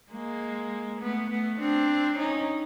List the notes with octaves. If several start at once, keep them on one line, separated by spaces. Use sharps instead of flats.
G#3 A#3
A3 B3
A3 B3
C4 D4
C#4 D#4